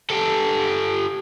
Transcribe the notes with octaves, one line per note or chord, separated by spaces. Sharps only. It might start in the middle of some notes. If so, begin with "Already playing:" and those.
G4 A4